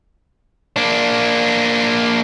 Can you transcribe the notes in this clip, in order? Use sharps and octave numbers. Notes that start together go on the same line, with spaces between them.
A#3 D4